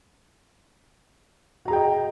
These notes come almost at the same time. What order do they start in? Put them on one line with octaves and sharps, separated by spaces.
F#4 A#5 G#4 G5 D#5